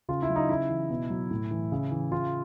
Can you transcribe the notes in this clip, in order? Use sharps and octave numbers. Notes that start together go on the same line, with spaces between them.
C#3 F4
E4
F#3
D#4
C#3 E4
E3
B2
F#3
A2
E3
C#3
E3
C#3 F4